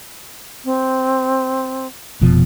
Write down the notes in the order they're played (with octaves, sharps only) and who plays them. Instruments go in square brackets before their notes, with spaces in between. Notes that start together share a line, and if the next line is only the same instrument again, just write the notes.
[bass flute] C4
[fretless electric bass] F1 B2 F3